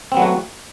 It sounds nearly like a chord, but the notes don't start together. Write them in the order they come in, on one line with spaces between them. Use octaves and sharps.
C4 B3 F#3 A3 F#4